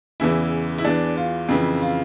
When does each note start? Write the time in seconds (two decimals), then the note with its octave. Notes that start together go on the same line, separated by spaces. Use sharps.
0.20 E2 C#3 E3 E4
0.78 E4
0.85 E2 E3 D4
1.17 F4
1.49 F2 C#3 E3
1.82 F4